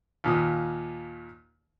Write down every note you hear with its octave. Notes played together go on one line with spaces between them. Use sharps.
D#2 A#2 D#6